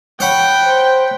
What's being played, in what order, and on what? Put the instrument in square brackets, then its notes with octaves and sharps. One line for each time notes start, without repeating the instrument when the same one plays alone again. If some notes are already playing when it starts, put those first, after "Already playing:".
[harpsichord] C#5 F#5 B5 [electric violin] G5
[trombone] C5